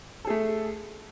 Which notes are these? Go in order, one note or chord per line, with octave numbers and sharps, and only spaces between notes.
A3 G#4 A4